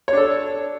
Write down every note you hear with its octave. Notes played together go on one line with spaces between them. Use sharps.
D4 A4 C#5